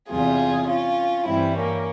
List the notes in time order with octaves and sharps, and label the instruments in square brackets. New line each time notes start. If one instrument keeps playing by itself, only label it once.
[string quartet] E2 C3 G3 F4 G#4
C#4 F4
G2 E3 G3 C4 E4
A#3 C#4